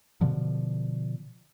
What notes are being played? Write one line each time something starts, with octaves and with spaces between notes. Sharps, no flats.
B2 D3 F3